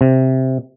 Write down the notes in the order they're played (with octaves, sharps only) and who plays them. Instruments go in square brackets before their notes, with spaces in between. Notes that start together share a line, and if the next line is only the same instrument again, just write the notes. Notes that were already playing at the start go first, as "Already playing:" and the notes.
[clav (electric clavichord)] C3